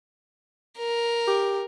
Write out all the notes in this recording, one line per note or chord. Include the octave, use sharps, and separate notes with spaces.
A#4
G4